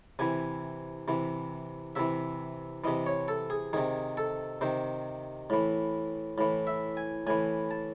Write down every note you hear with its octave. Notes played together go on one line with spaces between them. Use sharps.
C3 E3 G#5
C3 E3
C3 E3 E5
C3 E3 D#5
C#5
A4
G#4
C3 D#3 G#4
A4
C3 D#3 C5
A2 E3
A2 E3
E5
G#5
A2 E3 G#5
A5